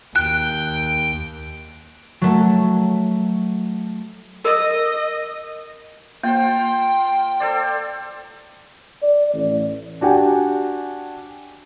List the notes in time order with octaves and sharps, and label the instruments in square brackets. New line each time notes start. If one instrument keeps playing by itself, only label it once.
[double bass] D#2 [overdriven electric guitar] G5 [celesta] F#6
[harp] F#3 A3
[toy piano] A#4 [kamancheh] D#5
[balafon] A#3 [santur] F4 C5 [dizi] G5
[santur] A4 C5 D5
[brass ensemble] D5
A1
[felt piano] D4 F#4 G4 G#5